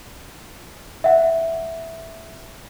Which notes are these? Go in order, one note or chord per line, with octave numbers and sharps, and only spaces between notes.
E5 F#5